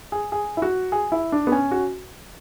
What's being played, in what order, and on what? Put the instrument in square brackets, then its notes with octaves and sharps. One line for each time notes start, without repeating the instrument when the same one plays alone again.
[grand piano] G#4
G#4
E4
F#4
G#4
E4
D4
B3
C#4
F#4